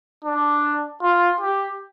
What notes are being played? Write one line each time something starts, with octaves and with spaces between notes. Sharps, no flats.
D4
F4
G4